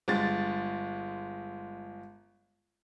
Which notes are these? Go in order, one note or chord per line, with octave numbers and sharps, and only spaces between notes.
G1 G#3 A6